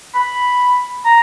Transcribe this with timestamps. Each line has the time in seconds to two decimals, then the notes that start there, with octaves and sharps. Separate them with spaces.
0.15 B5
1.05 A#5